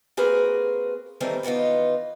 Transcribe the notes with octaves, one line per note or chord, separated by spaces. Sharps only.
A#3 C4 F#4 G#4 A#4 B4
D#3 E3 G3 A3 A#3 C4
D#3 E3 B3 D#4 F4